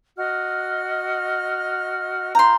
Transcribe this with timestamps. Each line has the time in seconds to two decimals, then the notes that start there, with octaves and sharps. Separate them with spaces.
0.18 F#4 D#5 F6
2.35 F4 A#5 C6 G6